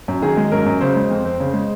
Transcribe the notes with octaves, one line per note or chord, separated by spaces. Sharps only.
F#2
D#3 G#4
G#3
F#2 A#4
F#2
C#3 C5
G#3
F2
C4
C#3
G#3